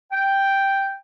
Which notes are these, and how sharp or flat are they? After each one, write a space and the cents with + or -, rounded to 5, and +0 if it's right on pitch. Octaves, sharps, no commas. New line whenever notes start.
G5 +0